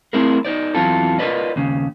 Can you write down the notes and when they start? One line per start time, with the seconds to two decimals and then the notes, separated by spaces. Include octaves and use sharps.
0.13 A3 C4 E4 G#4 A#4
0.45 D#4 C5 D5
0.75 E2 F#3 C4 E4 F4 A4
1.19 F4 G4 A#4 B4 D5 D#5
1.56 D#2 C#3